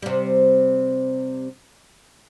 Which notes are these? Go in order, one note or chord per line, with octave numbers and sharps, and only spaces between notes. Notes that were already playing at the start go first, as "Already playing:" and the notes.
C3 G3